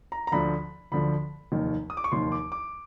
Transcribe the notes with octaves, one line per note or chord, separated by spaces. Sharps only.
A#5
A#5
D2 D3 F3 B5
D2 D3 F3 B5
F1 D#2 D#3
D#6
D6
C#6
F1 D#2 D#3 C6
D6
D6